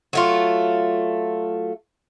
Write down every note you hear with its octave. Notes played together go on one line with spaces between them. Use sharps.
F#3 A3 F4